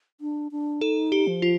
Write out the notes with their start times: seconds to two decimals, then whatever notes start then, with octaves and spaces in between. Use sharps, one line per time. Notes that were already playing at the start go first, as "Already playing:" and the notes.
0.21 D4
0.52 D4
0.81 D#4 A4
1.12 G4
1.27 F3
1.42 F4